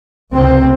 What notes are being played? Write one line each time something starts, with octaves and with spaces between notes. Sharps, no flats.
C#2 C3 C4